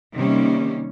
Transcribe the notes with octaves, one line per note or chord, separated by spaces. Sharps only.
C3 D#3 G3 A#3 C#4